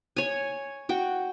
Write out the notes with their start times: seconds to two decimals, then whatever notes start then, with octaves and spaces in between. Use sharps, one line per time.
0.16 C#5 G#5
0.89 F#4 G5